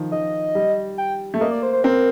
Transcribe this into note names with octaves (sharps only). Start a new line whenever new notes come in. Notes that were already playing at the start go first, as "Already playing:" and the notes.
Already playing: D#3 F3
D#3 D#5
G3
G5
A3
A#3 D#5
D5
C5
C5
C4 A#4